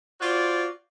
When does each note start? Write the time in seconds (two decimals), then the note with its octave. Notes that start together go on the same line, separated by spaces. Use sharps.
0.20 F4 F#4 C5 D5